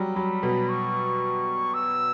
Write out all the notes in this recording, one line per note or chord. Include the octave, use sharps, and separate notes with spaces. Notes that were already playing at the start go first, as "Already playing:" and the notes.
Already playing: F#3 G3
F#3 B5
B2
C#6
E6